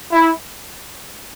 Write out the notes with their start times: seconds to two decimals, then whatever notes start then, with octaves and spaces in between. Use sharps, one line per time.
0.12 E4